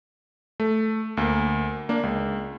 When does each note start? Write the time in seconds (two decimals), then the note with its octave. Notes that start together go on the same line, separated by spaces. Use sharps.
0.60 A3
1.17 D2 A#3
1.89 A#3 D4
2.03 C#2